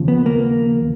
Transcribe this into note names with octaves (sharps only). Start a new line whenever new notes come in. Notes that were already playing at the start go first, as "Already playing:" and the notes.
Already playing: D#2 C#3 F3
B3
A#3